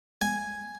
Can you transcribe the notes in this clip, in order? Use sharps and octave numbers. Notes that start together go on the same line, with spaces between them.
G#5